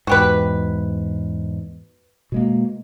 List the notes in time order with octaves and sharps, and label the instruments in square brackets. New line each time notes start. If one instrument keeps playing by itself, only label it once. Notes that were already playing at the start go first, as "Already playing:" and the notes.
[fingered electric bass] E2 G#2 [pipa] F#4 G4 B4
[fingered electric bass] B2 G#3 A#3